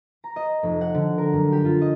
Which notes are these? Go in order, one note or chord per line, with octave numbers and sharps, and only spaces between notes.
A#5
D#5
F1
F#5
D3
A#4
F#2
G4
F4
D#5